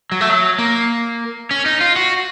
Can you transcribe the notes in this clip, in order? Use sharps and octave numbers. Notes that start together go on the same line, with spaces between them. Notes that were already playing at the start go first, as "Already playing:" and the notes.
F#3
A3
F#3
A#3
C#4
D#4
F4
F#4